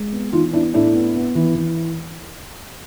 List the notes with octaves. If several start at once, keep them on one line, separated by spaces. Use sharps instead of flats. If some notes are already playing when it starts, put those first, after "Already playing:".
Already playing: G#3
B3
E3 D#4 F4
B3 D4 E4
A2 D4 E4
B3
B3
E3
E3